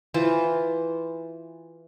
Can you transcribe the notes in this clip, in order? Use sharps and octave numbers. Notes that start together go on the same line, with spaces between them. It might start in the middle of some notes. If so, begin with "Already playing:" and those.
E3 F4 C5